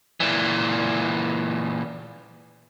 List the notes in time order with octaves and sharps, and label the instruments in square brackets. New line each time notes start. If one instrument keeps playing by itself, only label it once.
[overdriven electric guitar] A#2 E3